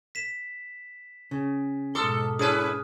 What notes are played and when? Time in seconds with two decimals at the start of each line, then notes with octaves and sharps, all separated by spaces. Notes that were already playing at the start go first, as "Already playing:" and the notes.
0.15 B6 E7
1.31 C#3
1.95 G#2 B2 A4 C6 D6 D#6 F6
2.39 C#4 E4 G#4 B4 D#6 F6